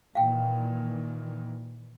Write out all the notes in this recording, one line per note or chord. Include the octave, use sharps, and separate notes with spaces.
A#2 D#3 E3 F5 G5